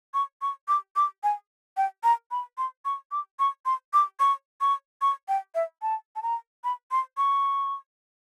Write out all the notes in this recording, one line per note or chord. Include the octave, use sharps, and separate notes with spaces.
C#6
C#6
D6
D6
G#5
G5
A#5
B5
C6
C#6
D6
C#6
C6
D6
C#6
C#6
C#6
G5
E5
A5
A5
A#5
B5
C6
C#6